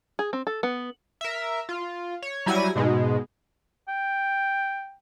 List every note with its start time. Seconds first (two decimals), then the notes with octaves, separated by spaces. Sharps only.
0.19 G#4
0.33 C4
0.47 A4
0.63 B3
1.21 A#4 E5
1.69 F4
2.22 C#5
2.46 F#3 G3 E4 G#5 G#6 A#6
2.75 G#2 B2 G#3
3.88 G5